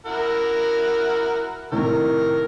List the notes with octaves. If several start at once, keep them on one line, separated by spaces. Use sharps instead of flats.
E4 F#4 A#4
A2 C3 D#3 A#4